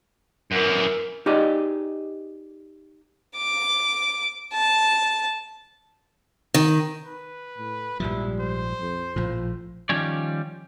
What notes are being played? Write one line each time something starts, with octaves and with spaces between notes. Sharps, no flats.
F#2 E3 A#4
D#4 G4 G#4 D5 D#5
D6
A5
D#3
B4
A2
A#1 G#2 F3 G3 E4
C5
F2
A#1 A2 F3
D#3 F3 G3 C#4 C#5 D5